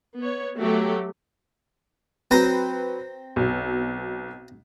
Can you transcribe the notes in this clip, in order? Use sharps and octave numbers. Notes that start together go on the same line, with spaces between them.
B3 C#5
F#3 A3 F#4 G4
F#3 C4 B4 C5 A#5
B1 B2